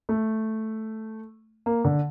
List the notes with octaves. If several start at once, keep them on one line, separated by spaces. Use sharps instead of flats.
A3
A#3
D3